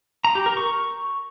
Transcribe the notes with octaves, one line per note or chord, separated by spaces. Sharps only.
A#5
G4
A#4
C#6